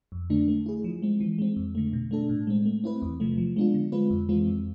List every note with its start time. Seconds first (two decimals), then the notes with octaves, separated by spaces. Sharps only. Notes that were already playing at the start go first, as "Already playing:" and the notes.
0.12 F2
0.30 D3 A3 D4
0.48 A3
0.66 E4 G#4
0.84 F3
1.02 G#3 C4
1.20 E3
1.38 G#3 C4
1.56 F2
1.75 D3 A3
1.93 B2
2.11 A3 D4 A4
2.29 A2
2.47 G#3 C4
2.65 A3
2.84 C4 E4 B4
3.02 E2
3.20 C3 F3 A3
3.38 F3
3.56 G#3 B3 D4 F4
3.74 D3
3.92 G#3 C4 F4 B4
4.10 F2
4.29 E3 G#3 C4 F4
4.47 F2